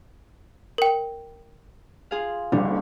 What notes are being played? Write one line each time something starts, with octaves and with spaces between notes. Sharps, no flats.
A#4 G5
F4 G#4 F5
F#1 D3 G3